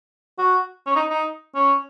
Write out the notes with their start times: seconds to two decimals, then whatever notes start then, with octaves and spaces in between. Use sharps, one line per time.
0.39 F#4
0.86 C#4
0.96 D#4
1.10 D#4
1.55 C#4